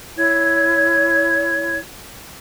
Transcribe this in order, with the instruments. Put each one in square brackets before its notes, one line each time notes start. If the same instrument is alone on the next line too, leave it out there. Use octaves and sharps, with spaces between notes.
[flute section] E4 C#5 G#6